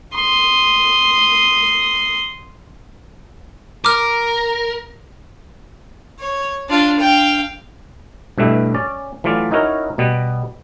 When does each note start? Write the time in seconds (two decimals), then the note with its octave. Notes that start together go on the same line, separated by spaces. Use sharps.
0.15 C6 D#6
3.85 A#4 A#5 D6 F6
6.20 C#5
6.69 D4 F4
7.00 F5 G5
8.38 G2 B2 G3 A3 E4
8.74 C#4 D5
9.24 E3 F#3 A3 F4 D5
9.51 C#4 D#4 E4 F#4 A#4 C#5
9.98 B2 G3 B3